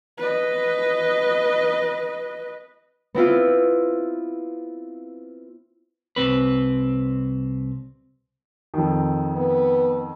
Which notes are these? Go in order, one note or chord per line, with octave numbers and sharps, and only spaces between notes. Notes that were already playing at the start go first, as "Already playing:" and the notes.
B4 D#5
B3 C4 E4 F4
C2 C4 B4
F2 D#3
B3